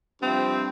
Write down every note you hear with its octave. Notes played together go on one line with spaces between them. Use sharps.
G2 C3 F3 C4